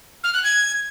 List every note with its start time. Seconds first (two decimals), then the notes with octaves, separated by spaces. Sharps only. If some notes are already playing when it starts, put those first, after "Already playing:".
0.24 F6
0.34 F#6
0.44 G#6